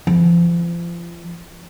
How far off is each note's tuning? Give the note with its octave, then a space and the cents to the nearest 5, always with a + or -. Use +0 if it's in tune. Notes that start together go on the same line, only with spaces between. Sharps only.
F3 -35